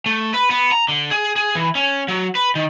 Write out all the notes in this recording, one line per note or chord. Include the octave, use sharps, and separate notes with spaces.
A3
B4
B3
A#5
D3
G#4
G#4
E3
C#4
F#3
B4
D#3